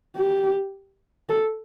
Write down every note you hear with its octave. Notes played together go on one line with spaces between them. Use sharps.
G4
A4